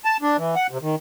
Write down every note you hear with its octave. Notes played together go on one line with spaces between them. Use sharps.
A5
D4
E3
F#5
C3
D#3